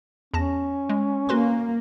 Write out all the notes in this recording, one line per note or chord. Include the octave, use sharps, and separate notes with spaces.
E2 C#4 A5 A#6
G#3
A#3 F#4 B4 C6